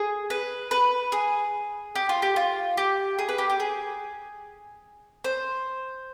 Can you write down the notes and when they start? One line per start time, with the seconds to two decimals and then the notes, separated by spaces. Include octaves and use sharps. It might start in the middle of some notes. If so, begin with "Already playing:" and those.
Already playing: G#4
0.30 B4
0.71 B4
1.12 G#4
1.95 G4
2.09 F4
2.22 G4
2.36 F4
2.77 G4
3.19 G#4
3.29 B4
3.38 G4
3.50 G4
3.60 G#4
5.24 C5